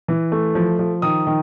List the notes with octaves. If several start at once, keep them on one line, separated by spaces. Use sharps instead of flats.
E3
A3
F3
F3
D#3 D#6
D#3